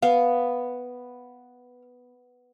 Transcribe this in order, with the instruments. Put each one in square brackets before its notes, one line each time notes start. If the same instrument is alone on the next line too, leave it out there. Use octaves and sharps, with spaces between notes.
[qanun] B3 [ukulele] F5